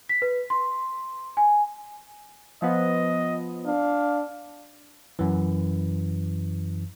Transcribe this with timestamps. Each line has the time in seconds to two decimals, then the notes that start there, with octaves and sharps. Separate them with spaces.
0.09 B6
0.22 B4
0.50 C6
1.37 G#5
2.62 F3 B3 D#5
3.66 D4 F5
5.19 F#2 E3